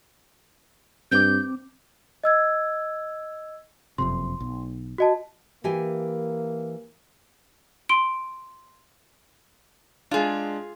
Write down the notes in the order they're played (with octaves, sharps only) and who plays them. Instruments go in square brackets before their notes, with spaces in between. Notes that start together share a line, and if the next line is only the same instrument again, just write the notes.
[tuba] G2 [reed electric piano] C4 D6 [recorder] G6
[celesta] D#5 E6 G#6
[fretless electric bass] F#1 F2 C3 [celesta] C6
[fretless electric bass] B1
[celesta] F#4 D#5 A5
[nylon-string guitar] E3 G4 G#5 [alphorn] A#3
[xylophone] C6 D7
[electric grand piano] G#3 D4 [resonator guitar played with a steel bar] F4 G#4